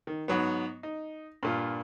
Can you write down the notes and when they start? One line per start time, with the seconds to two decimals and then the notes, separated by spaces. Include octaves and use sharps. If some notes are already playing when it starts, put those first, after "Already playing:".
0.07 D#3
0.28 G#2 F#3 B3
0.83 D#4
1.43 G2 A#2 F4